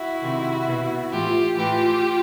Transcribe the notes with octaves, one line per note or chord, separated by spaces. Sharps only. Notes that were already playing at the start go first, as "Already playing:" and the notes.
Already playing: E4 F#4
C3 D#3
B2
A2 E3 F4 G4
A2 E3 F4 G4